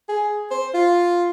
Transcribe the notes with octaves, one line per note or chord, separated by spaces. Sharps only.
G#4
C5
F4